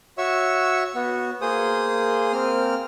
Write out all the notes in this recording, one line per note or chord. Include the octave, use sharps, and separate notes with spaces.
F#4 C#5 E5 C#6 E6
B3 F#4
A#3 G#4 C5 D#6
A#3 C4 F6